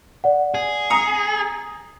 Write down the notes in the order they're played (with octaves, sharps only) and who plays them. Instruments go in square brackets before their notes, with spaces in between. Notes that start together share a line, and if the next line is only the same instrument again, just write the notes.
[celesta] D5 F#5
[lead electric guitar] G#4
[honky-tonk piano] A#5 D#6 [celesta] C#7